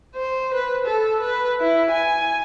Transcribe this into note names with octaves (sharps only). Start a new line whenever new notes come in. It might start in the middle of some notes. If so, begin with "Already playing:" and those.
C5
B4
A4
B4
E4
G#5